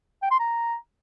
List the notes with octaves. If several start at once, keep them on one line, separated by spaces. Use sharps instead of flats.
G5
C6
A#5